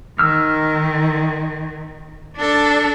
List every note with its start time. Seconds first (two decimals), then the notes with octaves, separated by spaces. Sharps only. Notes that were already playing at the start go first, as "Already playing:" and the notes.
0.19 D#3 E6 F6
2.37 D4 A4